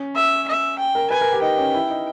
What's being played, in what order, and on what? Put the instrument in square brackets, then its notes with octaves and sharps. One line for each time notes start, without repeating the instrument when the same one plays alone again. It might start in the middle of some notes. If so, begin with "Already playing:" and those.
Already playing: [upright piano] C#4
[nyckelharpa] E5
E5
G5
[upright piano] A#4
[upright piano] B4 [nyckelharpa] G#5
[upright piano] A#4
G4
[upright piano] D#4 [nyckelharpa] G5
[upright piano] C#4
E4
D#4